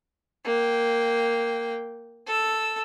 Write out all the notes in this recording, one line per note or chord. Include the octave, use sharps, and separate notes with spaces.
A#3 G5
A4 E6